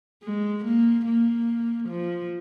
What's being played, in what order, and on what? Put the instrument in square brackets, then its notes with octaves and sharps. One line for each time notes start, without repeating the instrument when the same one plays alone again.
[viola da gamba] G#3
A#3
A#3
F3